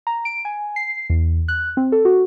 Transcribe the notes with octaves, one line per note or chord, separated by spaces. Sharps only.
A#5
D7
G#5
C7
E2
F#6
C4
A4
F#4